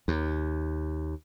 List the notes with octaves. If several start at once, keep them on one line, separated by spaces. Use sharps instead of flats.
D#2